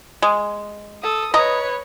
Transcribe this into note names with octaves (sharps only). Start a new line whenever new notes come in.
G#3
A4 D#6
B4 C#5 D#5 A#5